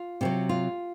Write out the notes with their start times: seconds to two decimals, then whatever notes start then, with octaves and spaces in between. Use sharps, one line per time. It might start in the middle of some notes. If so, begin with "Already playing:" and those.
Already playing: F4
0.21 C3 D#3 F#3
0.49 F4